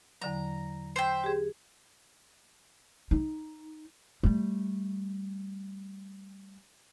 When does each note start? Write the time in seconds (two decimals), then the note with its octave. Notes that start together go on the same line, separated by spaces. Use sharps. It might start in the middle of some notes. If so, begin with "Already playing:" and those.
0.22 E2 D3 F#3 A#5
0.96 C5 E5 G5
1.24 G4 G#4
3.11 D#4
4.23 G3 A3